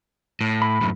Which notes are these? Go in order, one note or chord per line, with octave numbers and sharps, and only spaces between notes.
A2
B5
F#2 A2